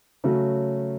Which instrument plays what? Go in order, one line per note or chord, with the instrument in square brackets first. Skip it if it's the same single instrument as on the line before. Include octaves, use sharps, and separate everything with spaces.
[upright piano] C#3 F#3 A3 C#4 F#4